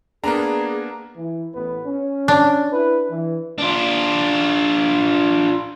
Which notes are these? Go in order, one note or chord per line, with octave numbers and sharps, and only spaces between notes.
A#3 B3 D4 G#4 A#5
E3
A1 B3 B4
C#4
D4
E4 B4
E3
D4 F4